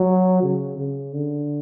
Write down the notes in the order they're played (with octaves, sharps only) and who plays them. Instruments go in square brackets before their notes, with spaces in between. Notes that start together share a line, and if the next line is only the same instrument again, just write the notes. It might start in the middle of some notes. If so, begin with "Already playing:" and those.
Already playing: [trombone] F#3
C#3
C#3
D3